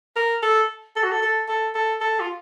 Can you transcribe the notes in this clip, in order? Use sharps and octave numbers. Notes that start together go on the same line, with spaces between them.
A#4
A4
A4
F#4
A4
A4
A4
A4
A4
F4